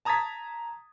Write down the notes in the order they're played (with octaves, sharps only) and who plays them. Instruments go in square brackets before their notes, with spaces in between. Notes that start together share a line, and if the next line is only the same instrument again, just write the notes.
[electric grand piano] A5 A#5 D#6 G#6 A6 B6